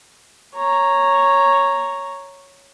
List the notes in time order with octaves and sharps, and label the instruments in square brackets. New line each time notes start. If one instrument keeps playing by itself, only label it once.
[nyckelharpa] C#5 A#5